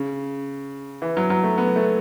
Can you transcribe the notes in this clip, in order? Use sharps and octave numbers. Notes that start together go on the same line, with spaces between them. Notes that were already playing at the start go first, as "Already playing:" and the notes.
Already playing: C#3
E3
F#3
F#3
A3
B3
A3